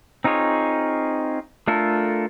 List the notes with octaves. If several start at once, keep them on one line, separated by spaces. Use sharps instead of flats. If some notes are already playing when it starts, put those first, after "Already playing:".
C4 D#4 F4 G#4 C#5
A3 D4 F4 A4 A#4